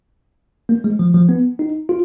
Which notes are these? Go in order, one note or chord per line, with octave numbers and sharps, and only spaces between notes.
A#3
G#3
F3
F3
B3
D#4
F4